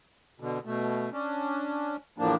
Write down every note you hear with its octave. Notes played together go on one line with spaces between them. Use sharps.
B2 D3
B2 A3
C#4 D4
E2 A2 F3 A#3 D4